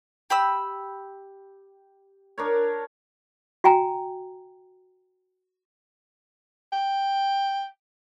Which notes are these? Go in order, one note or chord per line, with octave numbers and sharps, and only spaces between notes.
G4 B5 E6
D4 A#4 C#5
F#4 G5 G#5 A#5
G5